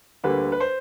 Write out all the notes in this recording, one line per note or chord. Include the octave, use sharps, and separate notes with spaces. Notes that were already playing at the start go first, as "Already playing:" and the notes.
D2 D3 G3 A#3 B4
B4
C5